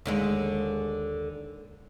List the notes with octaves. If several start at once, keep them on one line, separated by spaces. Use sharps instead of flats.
D#2 D3 G#3